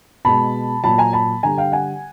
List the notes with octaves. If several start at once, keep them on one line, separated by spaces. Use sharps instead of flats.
B2 G#3 A5 B5
A#2 F#3 A5 B5
G#5 A#5
A5 B5
D3 G3 G#5 A#5
F5 G5
F#5 G#5